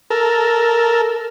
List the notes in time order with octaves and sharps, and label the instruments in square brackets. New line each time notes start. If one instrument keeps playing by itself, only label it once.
[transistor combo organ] A4 A#4